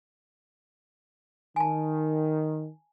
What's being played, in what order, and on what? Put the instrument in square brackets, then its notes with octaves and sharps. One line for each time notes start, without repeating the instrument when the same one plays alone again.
[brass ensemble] D#3 [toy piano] G#5 A5